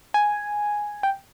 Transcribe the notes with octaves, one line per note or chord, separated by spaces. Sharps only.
G#5
G5